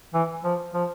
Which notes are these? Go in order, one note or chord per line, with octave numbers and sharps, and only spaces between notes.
E3
F3
F3